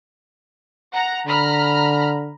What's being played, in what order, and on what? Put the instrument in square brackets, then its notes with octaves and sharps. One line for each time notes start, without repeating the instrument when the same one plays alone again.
[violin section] F#5 A#5
[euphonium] D3 [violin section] A#5 B5 F6